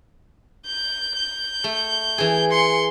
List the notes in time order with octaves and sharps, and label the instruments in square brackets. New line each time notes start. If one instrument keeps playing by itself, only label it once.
[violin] G6
G6
[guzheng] A3
E3 G#4
[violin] C6 C#7